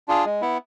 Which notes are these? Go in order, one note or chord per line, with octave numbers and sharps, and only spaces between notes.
D4 F4 G#4
G#3
B3 E4